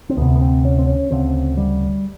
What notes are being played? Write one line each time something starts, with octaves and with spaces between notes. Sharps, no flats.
C4
D2 C3 B3
B3
C4
C#4
C4
C#4
D2 C#3 C4
G3